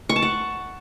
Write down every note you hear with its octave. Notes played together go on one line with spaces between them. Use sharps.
C#6
A5
F#5